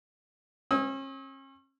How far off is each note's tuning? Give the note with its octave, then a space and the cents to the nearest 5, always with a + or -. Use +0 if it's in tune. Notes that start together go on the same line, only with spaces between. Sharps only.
C#4 -40 E6 -45